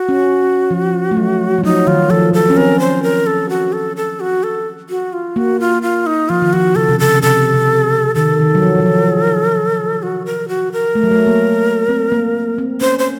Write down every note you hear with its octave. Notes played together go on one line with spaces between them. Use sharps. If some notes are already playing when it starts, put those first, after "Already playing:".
Already playing: F#4
C#4
F3
A3
F#3
F3
F#3 D#4
D#3 F4
F3 A4
F#3 A4
C#4
C4 A#4
C5
A#4
A4
F#4
A4
A4
F#4
A4
F#4
F4
A#3 F#4
F4
F4
D#4
F3 F4
D#3
F3 F#4
C#3 A4
C3
C#3 A4
C3 A4
C3
D#3 A4
D#3
F#3
F3
F#3
F3
F#4
A#4
F#4
A#4
A3
F#3
A3
A#3
C4
A#3
C4
C#4 C5
C5